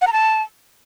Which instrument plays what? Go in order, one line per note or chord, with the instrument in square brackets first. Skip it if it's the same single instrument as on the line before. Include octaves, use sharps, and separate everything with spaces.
[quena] F#5
A#5
A5